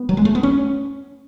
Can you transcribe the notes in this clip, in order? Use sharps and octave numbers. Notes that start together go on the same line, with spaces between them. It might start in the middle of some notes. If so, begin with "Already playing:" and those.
Already playing: B3
F#3
G#3
A3
B3
C#4